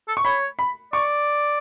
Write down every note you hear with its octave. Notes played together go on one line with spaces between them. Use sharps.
A4
C#6
C#5 B5
B5
D5 C#6